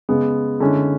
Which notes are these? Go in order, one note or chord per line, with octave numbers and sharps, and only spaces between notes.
C#3 G#3 B3
D3 G#3 C#4 E4